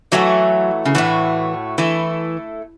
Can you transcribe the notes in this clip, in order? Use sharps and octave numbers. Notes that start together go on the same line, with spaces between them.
E3 F#3 A3 F#4 A4
C#3
A2 E3 A3 C#4 F#4
E3 A3 E4 A4